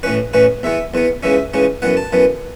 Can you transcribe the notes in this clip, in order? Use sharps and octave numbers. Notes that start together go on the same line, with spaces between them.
A2 E3 C#4 B4
A2 E3 C#4 B4
E2 E3 B3 E5
E2 E3 B3
C#2 C#3 E3 C#4 E5
C#2 C#3 E3 C#4
F#2 E3 B3 F#5
A5
F#2 E3 B3